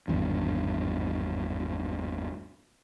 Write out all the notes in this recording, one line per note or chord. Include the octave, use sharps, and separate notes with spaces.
G#1 E2 G2